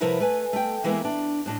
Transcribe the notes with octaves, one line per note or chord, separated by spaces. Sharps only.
C3 F3 E4 A#4 B4 F#5
A3 B4 G#5
A3 G5
E3 G#3 A#3 B3 E4
D4
A2 D4 D#5